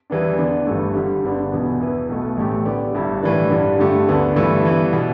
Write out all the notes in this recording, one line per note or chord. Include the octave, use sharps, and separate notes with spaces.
E2 E3 G3 B3 D4
D3 B3 D4
G1 G2 E3 A3
G2 D3 G3
G1 G2 D3 B3 D4
E2 B2 B3
E2 E3 B3
B1 B2 A3
A1 A2 A3 G4
D3 B3 G4 D5
G1 G2 G3 E4
A2 E3 G3 D4 B4
G2 D3 G3 D4
G2 D3 A3 G4
D2 D3 B3 D4 A4
G2 E3 A3 E4
G2 E3 B3
B2